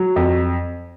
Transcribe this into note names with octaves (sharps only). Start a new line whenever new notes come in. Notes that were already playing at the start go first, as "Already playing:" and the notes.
Already playing: F#3
F2